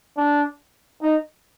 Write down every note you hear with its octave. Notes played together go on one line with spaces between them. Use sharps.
D4
D#4